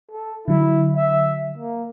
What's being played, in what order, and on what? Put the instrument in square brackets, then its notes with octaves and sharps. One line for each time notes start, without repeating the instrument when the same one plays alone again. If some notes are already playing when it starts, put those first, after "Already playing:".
[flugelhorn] A4
[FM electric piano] D3 F#3 [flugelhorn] E4
[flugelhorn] E5
A#3